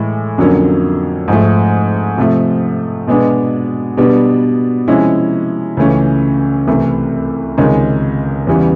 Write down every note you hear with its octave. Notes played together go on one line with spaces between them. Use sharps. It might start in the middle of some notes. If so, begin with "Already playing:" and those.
Already playing: A2 E3 G#3
F2 D3 F#3 A#3 C#4
G#2 F3 A3
C3 F3 A3
B2 G#3 B3 D4
B2 G3 B3 D4
C3 F3 G#3 C#4 E4
C#2 C#3 E3 A3 C#4
C2 C3 E3 A3
C#2 C3 D#3 G#3 C#4
E2 C#3 E3 G3 B3